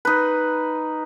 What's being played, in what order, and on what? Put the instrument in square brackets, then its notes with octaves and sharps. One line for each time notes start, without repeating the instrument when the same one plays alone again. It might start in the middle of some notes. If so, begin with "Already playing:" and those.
[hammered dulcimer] D#4 B4